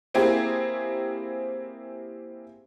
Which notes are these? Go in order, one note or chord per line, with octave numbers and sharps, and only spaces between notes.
A#3 C4 E4 G4 G#4